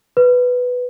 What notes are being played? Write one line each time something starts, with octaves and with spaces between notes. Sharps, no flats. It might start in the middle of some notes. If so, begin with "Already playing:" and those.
B4